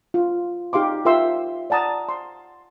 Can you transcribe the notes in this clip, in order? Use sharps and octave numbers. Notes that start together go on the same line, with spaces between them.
F4
D#4 G4 F5 C6 D6
F4 A#4 E5 G5 C6 E6
D5 F#5 A5 A#5 D#6
C6